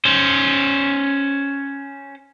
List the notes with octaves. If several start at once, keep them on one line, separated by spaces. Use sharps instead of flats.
C#4 C5